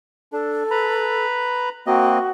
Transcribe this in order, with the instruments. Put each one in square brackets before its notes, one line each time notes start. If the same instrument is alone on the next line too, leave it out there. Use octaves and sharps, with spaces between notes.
[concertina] D4 [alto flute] A4
[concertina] B4 A#5 B5
[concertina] A#3 C4 D#5 [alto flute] F#4